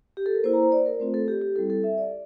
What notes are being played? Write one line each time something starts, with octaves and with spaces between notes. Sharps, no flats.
G4
A4
A#4
A#3 E4 C5
A#5
C5
D5
A#4
A3 C4 F4 C5
A4
G4
G4
G3 C4 E4 A4
A4
E5
D5